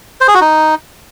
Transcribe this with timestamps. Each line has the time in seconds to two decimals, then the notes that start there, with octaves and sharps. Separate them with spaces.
0.21 C5
0.28 G#4
0.34 F#4
0.41 D#4